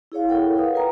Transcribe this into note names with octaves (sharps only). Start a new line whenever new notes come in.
E4 G#4 C#5 F5
E4 A4 A#4 C#5 F#5 G5
B4 F5 D#6
F4 A#4 G5 A#5